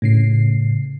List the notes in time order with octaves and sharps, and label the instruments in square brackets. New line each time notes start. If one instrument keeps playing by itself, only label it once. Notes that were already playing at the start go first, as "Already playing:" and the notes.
[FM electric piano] A2 C#3 C7